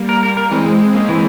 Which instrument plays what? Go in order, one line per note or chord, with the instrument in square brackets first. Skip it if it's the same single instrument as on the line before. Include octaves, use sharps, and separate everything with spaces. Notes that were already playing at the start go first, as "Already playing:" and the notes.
Already playing: [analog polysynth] G3 A#3
[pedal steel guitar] A#4
A#4
A#4
[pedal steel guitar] E3 [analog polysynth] G#3 C4
[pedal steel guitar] G#3
G#3
[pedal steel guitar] G#3 [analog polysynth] A#3 C#4
[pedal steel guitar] E3